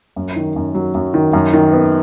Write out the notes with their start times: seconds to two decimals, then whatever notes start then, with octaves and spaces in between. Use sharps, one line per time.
0.16 F#2
0.36 D#3
0.56 F#2
0.75 F#3
0.95 F#2
1.14 D#3
1.33 F#2
1.53 D#3
1.73 B3